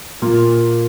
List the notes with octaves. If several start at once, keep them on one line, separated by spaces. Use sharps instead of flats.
A#2 A#3 F4